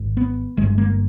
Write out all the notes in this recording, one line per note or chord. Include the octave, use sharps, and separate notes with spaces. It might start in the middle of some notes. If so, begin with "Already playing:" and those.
Already playing: G#1 G#2
B3
G1 G2 G#3
A#3